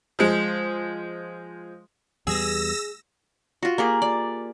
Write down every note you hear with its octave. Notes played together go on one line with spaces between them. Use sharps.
F3 G#3
E2 G3 B3 G#4 E6 A#6
F4 F#4
A#3 G4 G#4
D5